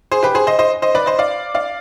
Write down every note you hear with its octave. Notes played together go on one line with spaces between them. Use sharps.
G#4 C5
G4 B4
G#4 C5
C5 D#5
C5 D#5
C5 D#5
B4 D5
C5 D#5
D5 F5
D5 F5